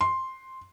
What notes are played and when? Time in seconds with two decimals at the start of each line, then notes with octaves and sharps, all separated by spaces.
0.01 C6